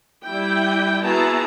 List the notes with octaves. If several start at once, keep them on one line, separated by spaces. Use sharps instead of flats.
G3 E4 G5
B3 E4 F#4 G#4 A5 A#5